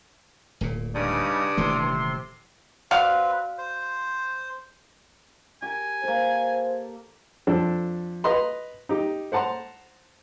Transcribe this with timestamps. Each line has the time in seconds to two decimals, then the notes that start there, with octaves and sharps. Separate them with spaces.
0.61 D1 A#2
0.95 G2 C#3 G3 D#4 D5 D6 D#6
1.57 D#1 C3 E3 A3 C6
2.91 C4 F#4 B4 D5 F5
3.58 C5
5.62 G4 A#4 G#5
6.03 A#3 A4 C5
7.47 F2 D4 A4
8.24 B4 D#5 A#5 C6
8.89 D#4 G4
9.32 C5 F#5 A5 A#5 C6